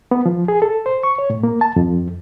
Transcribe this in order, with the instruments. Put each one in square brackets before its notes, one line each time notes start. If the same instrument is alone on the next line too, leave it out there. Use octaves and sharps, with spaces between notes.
[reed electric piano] B3
F3
G#4
A4
C5
C#6
C#5
A2
A#3
A5
F2